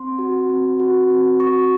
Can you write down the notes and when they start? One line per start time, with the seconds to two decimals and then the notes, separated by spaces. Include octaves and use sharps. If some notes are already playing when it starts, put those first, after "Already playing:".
Already playing: C4 C6
0.19 F#4
0.49 C4
0.80 F#4
1.10 C4
1.40 F#4 C#6